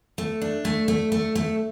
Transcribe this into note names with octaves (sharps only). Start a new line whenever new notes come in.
A3
D4
A3
A3
A3
A3